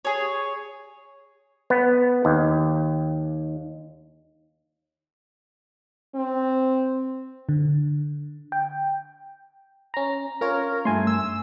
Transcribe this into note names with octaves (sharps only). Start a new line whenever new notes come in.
G#4 C#5
B3
D#2
C4
D3
G5
C#4 A#5
C#4 F4 A#4 C#5
G2 A3 G#5 C6
E6